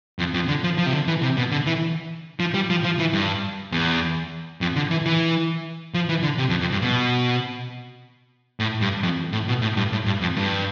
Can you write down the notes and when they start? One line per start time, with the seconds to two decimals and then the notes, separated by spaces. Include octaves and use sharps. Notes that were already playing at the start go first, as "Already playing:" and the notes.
0.19 F2
0.34 F2
0.48 D3
0.64 F3
0.78 F3
0.86 C3
0.93 D3
1.07 E3
1.22 C3
1.37 B2
1.52 D3
1.66 E3
2.40 F3
2.54 G3
2.70 F3
2.84 F3
2.99 E3
3.13 G2
3.72 E2
4.61 F2
4.76 D3
4.90 E3
5.06 E3
5.94 F3
6.09 E3
6.23 D3
6.38 C3
6.50 F2
6.61 F2
6.72 G2
6.82 B2
8.60 A2
8.81 G2
9.03 F2
9.33 A2
9.48 B2
9.62 A2
9.77 G2
9.92 A2
10.06 G2
10.21 F2
10.36 G2